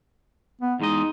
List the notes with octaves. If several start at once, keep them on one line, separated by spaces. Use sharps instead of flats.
B3
E2 G#3 D#4 D#5